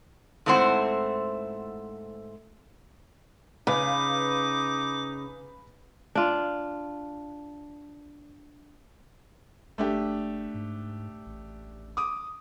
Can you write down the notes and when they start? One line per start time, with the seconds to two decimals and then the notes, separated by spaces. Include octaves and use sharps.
0.46 G#2 A3 C4 E4 C5 F#5
3.67 C#3 D#4 B4 F5 D6
6.15 D4 F4
9.78 F#1 A3 D4 G4
10.54 G#2
11.26 A1
11.97 D6 D#6